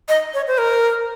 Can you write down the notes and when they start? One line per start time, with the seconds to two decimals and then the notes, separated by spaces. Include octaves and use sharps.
0.09 D#5
0.34 C#5
0.47 C5
0.58 A#4